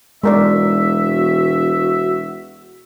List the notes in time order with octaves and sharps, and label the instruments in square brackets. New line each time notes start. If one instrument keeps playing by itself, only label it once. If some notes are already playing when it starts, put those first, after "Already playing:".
[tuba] E1 [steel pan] G#3 A#4 D5 [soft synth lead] F#4 [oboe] E5